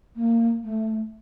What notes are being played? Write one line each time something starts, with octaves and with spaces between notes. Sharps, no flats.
A#3
A3